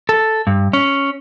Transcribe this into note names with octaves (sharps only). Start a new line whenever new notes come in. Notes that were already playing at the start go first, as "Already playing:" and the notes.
A4
G2
C#4